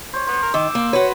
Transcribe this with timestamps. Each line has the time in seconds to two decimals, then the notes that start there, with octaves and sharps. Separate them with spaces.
0.13 C5 C#5
0.27 B3 C5
0.42 A#4
0.54 D#3 D6 E6
0.75 A#3
0.93 F#4 B4 C#5